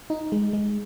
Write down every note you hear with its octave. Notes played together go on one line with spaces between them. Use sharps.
D#4
G#3
G#3